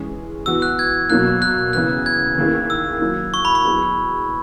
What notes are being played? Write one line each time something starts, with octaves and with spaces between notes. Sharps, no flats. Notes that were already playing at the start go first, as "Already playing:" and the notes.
Already playing: E3 G#3 C#4 G#4
E3 B3 F#4 E6
F#6
G#6
B2 F#3 A#3 F#6
F#6
C#3 E3 B3 F#6
G#6
D#3 A#3 C#4 E4 G#4
E6
F#3 A#3 E4
C#6
B5
C#6
F#3 B3 E4 G#4